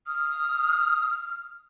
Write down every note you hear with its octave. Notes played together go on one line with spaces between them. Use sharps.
D#6 F6